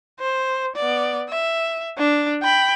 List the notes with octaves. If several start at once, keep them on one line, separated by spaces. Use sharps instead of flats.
C5
B3 D5
E5
D4
G5 B5